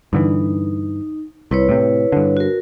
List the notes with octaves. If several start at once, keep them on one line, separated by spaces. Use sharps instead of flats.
G2 D3 E3 D#4
C2 E4 B4 C#5
A2 C3
G2 D3
F#4 A#4